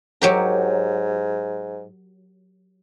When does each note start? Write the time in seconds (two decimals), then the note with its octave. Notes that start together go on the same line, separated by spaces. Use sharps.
0.22 G#2 F#3 G4 A#4